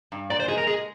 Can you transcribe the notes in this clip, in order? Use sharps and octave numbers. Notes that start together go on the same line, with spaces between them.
G2
A#2 D5
C5
G#3 G#4
A#4
G#3 G#4